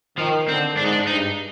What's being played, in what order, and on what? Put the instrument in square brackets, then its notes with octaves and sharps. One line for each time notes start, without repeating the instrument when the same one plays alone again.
[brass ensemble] D#3 [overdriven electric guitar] F3
[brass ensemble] D3 [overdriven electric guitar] C4
[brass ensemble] G#2 [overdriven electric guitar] D4
[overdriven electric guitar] D#4
D4
[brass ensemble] G2 [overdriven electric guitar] D#4